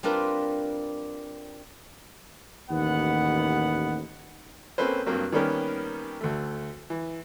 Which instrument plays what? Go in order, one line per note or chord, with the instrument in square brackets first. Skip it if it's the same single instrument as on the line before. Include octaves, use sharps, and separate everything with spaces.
[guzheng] G3 C4 D4 F4 A#4 B4
[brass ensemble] A1 D#2 B3 F#5
[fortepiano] A#3 C4 C#4 A4 B4 C5
G2 F#3 A#3 C4
D#3 G3 A#3 B3 C#4 A#4
D2 A3
E3